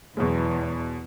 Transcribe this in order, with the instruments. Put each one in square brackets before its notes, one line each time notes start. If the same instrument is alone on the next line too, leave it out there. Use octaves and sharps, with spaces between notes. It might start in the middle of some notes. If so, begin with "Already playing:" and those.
[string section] E2 [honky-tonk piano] B2 F#3 G#3